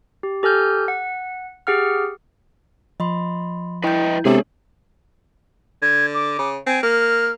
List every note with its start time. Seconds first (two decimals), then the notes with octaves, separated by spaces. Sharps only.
0.23 G4
0.43 G4 A4 G#5 F6 G6
0.88 F#5
1.67 G4 G#4 F#5 F6
3.00 F3 D#5 B5 C6
3.84 E4 B4 D#5 G5 G6
4.25 C3 G#3 B3 D4 G#4 A4 C#5
5.82 D3 G#6
6.14 D6
6.39 C#3
6.66 C4 G#5
6.83 A#3 F6